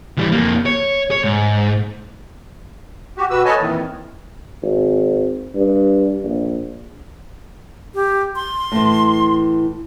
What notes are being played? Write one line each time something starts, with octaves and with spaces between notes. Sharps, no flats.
E3 G3
F2 A#3
C#5
C#5
G#2
F#4 G4
B2 F#4 B4 E6
A4 B4 C#5 D#5 G#5 A5
F2 A#2 D#3 E3
G#1
G2
A#1
G4
C6
A2 E3